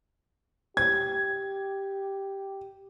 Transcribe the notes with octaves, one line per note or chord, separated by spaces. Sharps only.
G4 G#6